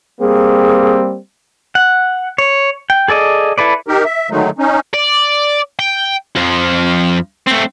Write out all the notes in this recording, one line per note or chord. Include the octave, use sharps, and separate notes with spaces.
G3 A#3 C4 G#4
F#5
C#5
G5
G#4 A4 D5 D#5
E4 A4 B4 D5
D#4 G4 A#4
E5
D3 D#3 F#3 G#3 A3 D#4
C#4 D#4
D5
G5
F2 F3
A3 C4